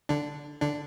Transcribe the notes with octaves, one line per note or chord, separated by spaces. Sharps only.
D3 D4
D3 D4